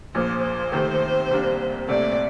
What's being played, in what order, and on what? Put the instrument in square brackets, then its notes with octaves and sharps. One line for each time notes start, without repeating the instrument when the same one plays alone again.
[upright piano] A#1 A#2 F3 [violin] C5
[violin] C5
[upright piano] C3 D#3 A3 C4
C2 C3 G3 A#3 D4
[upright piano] C2 A#2 A3 C4 [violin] D5